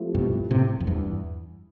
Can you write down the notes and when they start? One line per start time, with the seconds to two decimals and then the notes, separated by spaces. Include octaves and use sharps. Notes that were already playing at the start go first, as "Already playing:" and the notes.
Already playing: F3 A3 C4 E4 G4
0.14 G2 B2
0.51 A2 C3
0.80 F2
0.87 E2 G2